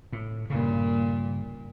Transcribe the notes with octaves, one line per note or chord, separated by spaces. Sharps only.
A2
G2 A#2 C#3